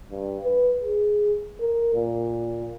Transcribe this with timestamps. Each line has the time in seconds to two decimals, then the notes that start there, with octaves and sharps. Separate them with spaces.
0.11 G2
0.43 B4
0.83 G#4
1.61 A#4
1.95 A#2